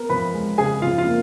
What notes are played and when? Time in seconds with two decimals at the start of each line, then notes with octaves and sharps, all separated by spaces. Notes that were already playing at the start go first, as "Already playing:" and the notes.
Already playing: B3 A#4
0.09 F3 B4 B5
0.34 G#3
0.58 C#3 G#4 G#5
0.82 F3 F4 F5
0.98 F4 F5
1.06 A#3